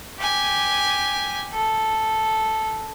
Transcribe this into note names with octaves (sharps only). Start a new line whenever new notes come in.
G4 G#5
A4